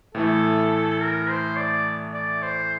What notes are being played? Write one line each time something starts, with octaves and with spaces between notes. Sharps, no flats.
A2 E3 A3 E4 A4
A#4
C5
D5
D5
C5